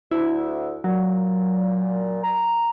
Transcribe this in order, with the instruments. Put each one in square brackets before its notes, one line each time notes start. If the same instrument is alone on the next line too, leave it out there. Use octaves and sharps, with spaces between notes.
[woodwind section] D2 [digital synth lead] E4
[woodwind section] A#2 [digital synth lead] F#3
[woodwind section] A#5